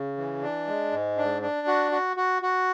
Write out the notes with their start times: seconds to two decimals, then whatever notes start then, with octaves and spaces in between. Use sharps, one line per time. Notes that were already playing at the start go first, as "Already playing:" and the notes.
Already playing: C#3
0.17 E3
0.42 D4
0.67 G#3
0.92 G#2
1.17 D4
1.42 D4
1.67 F#4
1.91 F#4
2.17 F#4
2.42 F#4